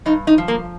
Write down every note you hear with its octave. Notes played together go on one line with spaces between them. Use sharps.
G2 D#4
D#4
F3
A#3